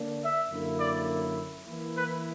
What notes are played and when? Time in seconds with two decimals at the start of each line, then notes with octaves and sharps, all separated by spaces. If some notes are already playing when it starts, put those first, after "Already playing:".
Already playing: D3 A#3 D4
0.21 E5
0.49 F#2 D3 A#3 E4
0.79 D5
1.66 E3 A#3 E4
1.95 B4